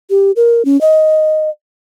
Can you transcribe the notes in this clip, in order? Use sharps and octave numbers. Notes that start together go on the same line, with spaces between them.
G4
A#4
C#4
D#5